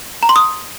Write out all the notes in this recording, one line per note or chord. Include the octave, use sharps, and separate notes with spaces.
A#5
C6
D#6